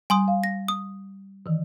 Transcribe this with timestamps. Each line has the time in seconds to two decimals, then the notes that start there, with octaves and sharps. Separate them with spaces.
0.10 G3 G#5 C6 D#6
0.28 F5
0.44 A#6
0.68 D#6
1.46 D#3 E3